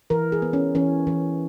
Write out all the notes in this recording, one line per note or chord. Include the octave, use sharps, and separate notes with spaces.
E3 A#4
G#4
B3
C#4
E3 C#4
E3